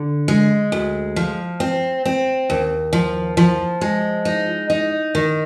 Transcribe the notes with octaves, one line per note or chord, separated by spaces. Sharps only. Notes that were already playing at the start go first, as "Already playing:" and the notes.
Already playing: D3
G#3
D2
F3
C4
C4
D#2
F3
F3
G#3
D#4
D#4
D#3